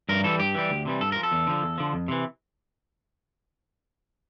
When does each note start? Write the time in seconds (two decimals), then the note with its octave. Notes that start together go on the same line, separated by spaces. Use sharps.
0.09 G2 A#4
0.24 E3 G3 A4
0.39 G2 G4
0.55 E3 G3
0.70 D2
0.85 C3 E3 G3
1.01 G2 A4
1.12 F3 A#4
1.23 A4
1.32 E2
1.47 D3 F3
1.62 E2
1.78 D3 F3
1.93 F2
2.08 C3 E3